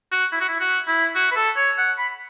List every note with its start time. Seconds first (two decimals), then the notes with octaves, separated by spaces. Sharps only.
0.11 F#4
0.32 E4
0.41 F#4
0.48 E4
0.60 F#4
0.87 E4
1.15 F#4
1.31 B4
1.36 A4
1.56 C#5
1.78 F#5
1.98 B5